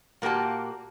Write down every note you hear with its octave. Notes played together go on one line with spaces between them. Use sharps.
A#2 A#3 F#4 G4 A5